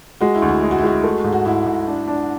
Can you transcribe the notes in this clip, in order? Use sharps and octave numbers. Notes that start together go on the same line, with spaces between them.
G#3 F#4
E4
D2
E4
G#3
F#4
E4
G#3 F#4
A3
G#2
F#4
G#2 E4
G#2
D4
D4